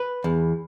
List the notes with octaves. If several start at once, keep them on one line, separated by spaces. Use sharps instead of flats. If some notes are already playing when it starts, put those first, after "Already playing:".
Already playing: B4
E2